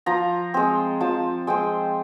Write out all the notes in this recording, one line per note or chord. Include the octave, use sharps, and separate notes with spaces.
F3 A#5
G#3 C4
F3 A5
G#3 C4 G5